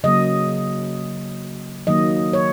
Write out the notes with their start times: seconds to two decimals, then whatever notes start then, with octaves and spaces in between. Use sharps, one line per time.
0.04 C#3 F#3 A#3 D#5
1.87 D#3 F#3 A#3 D#5
2.33 C#5